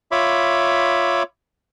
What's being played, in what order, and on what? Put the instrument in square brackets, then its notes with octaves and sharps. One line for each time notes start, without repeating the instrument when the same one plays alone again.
[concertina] F4 C#5 E5 B5 D6